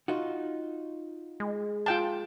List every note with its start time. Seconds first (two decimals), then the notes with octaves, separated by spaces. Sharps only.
0.08 D#4 F4 F#4
1.40 G#3
1.86 F4 G5 A5